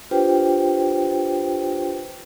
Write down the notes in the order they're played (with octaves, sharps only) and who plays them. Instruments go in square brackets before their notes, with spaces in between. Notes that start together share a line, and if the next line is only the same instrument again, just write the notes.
[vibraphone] D4 F4 G4 B4 C5 G5